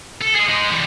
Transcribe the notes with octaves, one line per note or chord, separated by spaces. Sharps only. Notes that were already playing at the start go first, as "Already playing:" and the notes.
A4
G#4 D#5
G#3 D#4
E3 G3